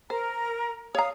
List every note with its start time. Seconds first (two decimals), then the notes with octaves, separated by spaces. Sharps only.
0.10 A#4 C5 A#5
0.95 C#5 F5 A#5 D#6